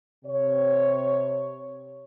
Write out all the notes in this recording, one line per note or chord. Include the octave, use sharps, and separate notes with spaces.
C3 C#5